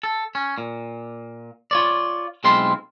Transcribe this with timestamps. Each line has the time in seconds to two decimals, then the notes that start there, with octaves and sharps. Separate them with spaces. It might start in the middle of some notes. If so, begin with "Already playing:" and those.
0.03 A4
0.35 C#4
0.58 A#2
1.71 F4 C#5 D5
2.44 B1 G#3 C4 E4 F4 C6